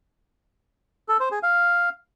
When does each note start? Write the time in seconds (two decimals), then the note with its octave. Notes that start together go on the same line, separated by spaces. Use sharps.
1.09 A4
1.20 C5
1.31 G#4
1.43 F5